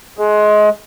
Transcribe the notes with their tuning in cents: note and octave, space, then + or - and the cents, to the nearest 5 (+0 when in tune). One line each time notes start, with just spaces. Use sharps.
G#3 +25